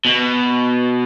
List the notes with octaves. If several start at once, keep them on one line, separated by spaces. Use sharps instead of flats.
B2